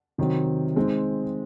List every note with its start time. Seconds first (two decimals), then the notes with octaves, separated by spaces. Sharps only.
0.18 C3 D#3 F#3 C4
0.76 G#3 C4 D#4